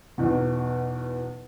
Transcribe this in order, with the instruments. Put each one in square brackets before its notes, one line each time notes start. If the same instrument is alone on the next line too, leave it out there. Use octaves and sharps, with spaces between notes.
[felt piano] B1 E2 B2